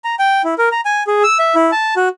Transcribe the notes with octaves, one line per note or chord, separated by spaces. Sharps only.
A#5
G5
E4
A#4
A#5
G#5
G#4
E6
E5
E4
A5
F#4